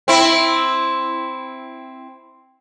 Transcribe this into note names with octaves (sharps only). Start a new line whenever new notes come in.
C4 E4